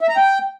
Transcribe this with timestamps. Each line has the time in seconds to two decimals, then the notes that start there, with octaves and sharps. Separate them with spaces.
0.01 E5
0.09 A#5
0.17 G5